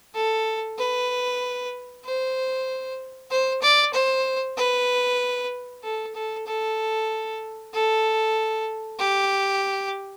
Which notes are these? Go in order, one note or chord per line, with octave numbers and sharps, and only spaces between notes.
A4
B4
C5
C5
D5
C5
B4
A4
A4
A4
A4
G4